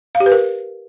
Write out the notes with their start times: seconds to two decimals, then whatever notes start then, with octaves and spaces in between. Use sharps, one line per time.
0.15 F5
0.20 G4
0.26 B4
0.32 A#4